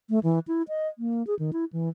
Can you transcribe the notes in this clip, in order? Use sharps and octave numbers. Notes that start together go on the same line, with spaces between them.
A3
E3
E4
D#5
A#3
G#4
D#3
E4
E3